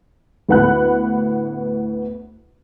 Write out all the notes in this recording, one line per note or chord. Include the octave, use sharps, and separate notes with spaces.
D2 A2 B3 F#5 B5 F#6